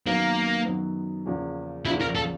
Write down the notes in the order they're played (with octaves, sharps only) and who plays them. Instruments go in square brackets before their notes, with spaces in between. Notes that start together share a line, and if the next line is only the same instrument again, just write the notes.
[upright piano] F#2 D#3 F#3 B3 [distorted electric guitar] A#3
[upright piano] F#2 D#3 F#3 B3
E2 C#3 F3 A#3 C#4
[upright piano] E2 C#3 F3 A#3 C#4 [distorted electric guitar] E4
[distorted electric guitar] A#4
A4